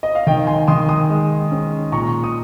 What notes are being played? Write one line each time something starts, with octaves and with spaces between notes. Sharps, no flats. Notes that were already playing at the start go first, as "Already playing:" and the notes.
D#5
F5
D#3 D#5 G5
G#5 C6
D#3 C6 D#6
C6 D#6
G#3
C#4
A#2 A#5 C#6
D#6